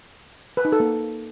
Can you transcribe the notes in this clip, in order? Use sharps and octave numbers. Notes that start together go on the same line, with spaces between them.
B4
D#4
A4
A#3